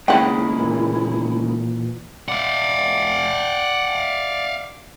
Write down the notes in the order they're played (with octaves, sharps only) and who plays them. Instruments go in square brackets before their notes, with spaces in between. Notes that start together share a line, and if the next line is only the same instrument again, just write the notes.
[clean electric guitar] D#2 C#3 G#3 [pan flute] E4 [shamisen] F#5 G5
[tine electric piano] A#2 E3
[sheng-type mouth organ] D5 [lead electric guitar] F5 F#5